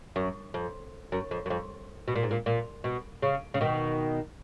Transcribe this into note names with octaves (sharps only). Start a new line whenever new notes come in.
F#2
F2
F#2
F2
F#2
F2
B2
A#2
G#2
A#2
A#2
B2
C#3
C#3
B2 D#3